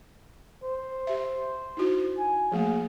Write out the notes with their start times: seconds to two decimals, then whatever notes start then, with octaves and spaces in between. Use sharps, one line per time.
0.63 C5
1.07 G4 E5
1.77 D#4 E4 F#4
2.18 G#5
2.52 F3 A3 A#3 G#4